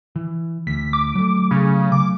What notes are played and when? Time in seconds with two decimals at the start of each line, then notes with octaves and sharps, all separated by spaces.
0.16 E3
0.67 D2 B6
0.93 D6
1.15 F#3 A3
1.51 C#3
1.92 D6